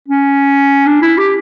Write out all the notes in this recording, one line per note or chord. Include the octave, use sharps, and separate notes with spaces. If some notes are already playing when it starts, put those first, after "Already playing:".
C#4
D4
E4
G4